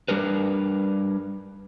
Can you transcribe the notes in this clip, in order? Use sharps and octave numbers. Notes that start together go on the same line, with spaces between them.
G3 D4 A#4 B4